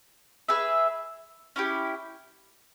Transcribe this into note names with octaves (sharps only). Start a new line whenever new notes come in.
G#4 B4 E5
C#4 E4 G4